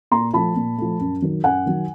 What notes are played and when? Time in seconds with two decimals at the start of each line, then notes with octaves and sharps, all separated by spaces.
0.11 A#2 A#5 C6
0.34 F3 A3 A5 B5
0.56 A#2
0.78 F3 A3
1.00 F#2
1.22 D#3 F#3
1.44 F#2 F#5 G#5
1.66 D#3 F#3